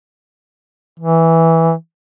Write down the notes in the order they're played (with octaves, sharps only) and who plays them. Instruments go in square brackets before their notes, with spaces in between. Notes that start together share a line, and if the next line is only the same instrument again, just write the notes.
[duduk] E3